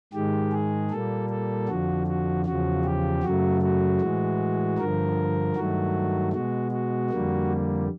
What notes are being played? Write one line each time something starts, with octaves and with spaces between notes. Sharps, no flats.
G#2 D#3 G#3 G4
G#4
A#2 G3 A#3 A4
A4
F2 D3 F3 F#4
F#4
E2 C#3 F3 F#4
G4
F#2 C#3 F#3 A3 F#4
F#4
A2 E3 G#3
G2 D3 F3 A#4
G2 D#3 F#3 A3 F#4
B2 G#3 F#4
F#4
F2 D3 G3 A#3